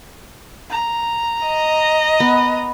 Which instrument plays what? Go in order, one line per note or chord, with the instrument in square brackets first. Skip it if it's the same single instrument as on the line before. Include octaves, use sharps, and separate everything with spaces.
[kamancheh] A#5
[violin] D#5
[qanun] B3